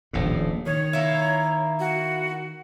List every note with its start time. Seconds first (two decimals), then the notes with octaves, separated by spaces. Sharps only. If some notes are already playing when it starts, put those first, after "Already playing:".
0.13 D#1 A#1 A2
0.66 D#3 C#5
0.93 A#3 E4
1.80 F#4